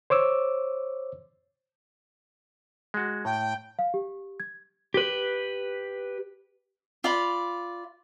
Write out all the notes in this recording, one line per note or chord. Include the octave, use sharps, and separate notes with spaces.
C5 C#5 D6 E6
G#3 F#4
A2 G5
F5
G4
G#6
G4 B4
F4 D5 B5